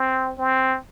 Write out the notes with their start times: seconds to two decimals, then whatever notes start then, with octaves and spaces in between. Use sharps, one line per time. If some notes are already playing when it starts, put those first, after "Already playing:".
Already playing: C4
0.38 C4